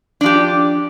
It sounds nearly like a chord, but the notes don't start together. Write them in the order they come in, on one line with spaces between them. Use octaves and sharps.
D4 F3 G4